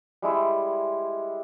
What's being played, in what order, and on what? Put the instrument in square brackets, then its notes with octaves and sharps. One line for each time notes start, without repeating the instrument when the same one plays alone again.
[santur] G3 G#3 E4